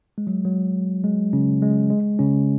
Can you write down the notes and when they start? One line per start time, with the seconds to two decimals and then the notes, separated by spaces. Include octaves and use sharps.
0.18 G#3
0.27 F#3
0.45 F#3
1.04 G#3
1.33 C#3 C#4
1.62 G#3
1.90 G#3
2.19 C#3 C#4